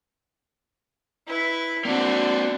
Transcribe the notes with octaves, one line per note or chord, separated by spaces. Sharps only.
E4 B4
A#3 C4 D4 F#4